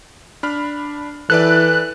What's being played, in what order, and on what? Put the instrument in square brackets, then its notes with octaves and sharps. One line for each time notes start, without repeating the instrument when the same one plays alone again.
[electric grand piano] D4 B5 F6
[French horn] E3 [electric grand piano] A4 B4 D5 [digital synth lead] F#6